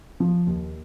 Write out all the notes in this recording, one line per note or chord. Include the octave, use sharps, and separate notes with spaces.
F3
D#2